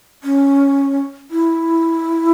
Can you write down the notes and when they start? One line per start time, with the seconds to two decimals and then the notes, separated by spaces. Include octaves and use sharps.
0.24 C#4
1.31 E4